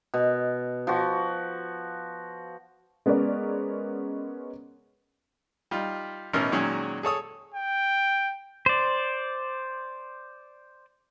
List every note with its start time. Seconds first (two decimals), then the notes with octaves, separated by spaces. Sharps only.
0.14 B2
0.87 F3 F#4
3.06 G#3 B3 C#4 A#4 D5
5.71 G3 D#4 F4
6.34 A1 B2 C#4 D#4 A#4 E6
6.52 A#2 D#3 F#3 G#3 C#4 G#4
7.03 G#4 A4 C#5 D#6
7.54 G5
8.66 C5 D5